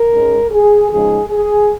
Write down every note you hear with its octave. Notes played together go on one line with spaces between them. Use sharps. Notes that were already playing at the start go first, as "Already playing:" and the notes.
Already playing: A#4
G#2 G#3 C#4
G#4
C#3 F3 G#3 D#4 G#4
G#4